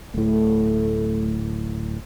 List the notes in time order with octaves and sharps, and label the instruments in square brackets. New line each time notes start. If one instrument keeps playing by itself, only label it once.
[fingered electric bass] D1 A2 [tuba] A3